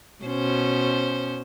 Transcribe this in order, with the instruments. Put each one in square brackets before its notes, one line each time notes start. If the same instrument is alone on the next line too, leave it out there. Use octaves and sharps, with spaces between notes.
[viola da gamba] B2 C#4 C5